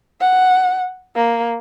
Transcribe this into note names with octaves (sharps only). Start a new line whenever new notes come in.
F#5
A#3